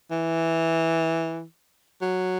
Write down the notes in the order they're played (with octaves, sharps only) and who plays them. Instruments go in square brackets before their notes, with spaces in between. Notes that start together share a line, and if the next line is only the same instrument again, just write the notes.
[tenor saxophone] E3
F#3